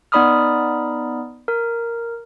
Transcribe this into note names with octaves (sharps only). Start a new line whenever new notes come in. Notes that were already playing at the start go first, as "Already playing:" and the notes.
B3 D#4 D5 B5 D#6 F6
A#4